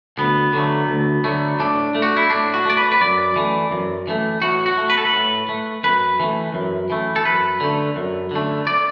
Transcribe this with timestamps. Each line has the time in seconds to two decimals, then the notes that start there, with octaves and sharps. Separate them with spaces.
0.18 D2 B3
0.53 D3 F#3 A3
0.89 D2
1.24 D3 F#3 A3
1.59 A2 D4
1.95 A3
2.02 F#4
2.17 E4
2.30 A2 D4
2.54 F#4
2.65 A3 D5
2.77 B4
2.92 B4
3.01 F#2 D5
3.36 E3 A3
3.71 F#2
4.07 E3 A3
4.42 A2 F#4
4.66 F#4
4.78 A3
4.90 B4
4.97 A4
5.05 B4
5.13 A2
5.49 A3
5.84 F#2 B4
6.20 E3 A3
6.54 F#2
6.90 E3 A3
7.16 A4
7.25 F#2 B4
7.60 D3 A3
7.96 F#2
8.31 D3 A3
8.67 D5